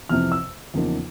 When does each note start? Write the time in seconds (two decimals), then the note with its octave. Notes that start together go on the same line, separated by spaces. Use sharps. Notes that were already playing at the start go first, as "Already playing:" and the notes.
0.09 F2 C3 E3 F6
0.32 E6
0.74 E2 C#3 F3 A#3 D#4